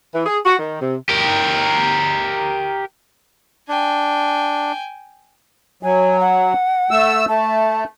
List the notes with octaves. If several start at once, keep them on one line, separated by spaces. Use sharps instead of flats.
E3
G#4
F#4
D#3
C3
G4 A#4
D4 G5 G#5
F#3 G#5
F#5
A3 E6
A3 A5